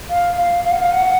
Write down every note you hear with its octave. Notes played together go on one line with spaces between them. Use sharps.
F5
F5
F5
F#5
F5
F#5